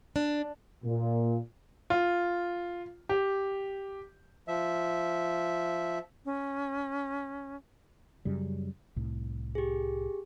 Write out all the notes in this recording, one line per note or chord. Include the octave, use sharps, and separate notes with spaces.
D4
A#2
F4
G4
F3 E5
C#4
F#2 C#3 G3
C2 A2
G4 G#4